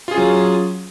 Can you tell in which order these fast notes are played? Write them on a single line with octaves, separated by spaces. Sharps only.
F4 G#4 C#4 F#3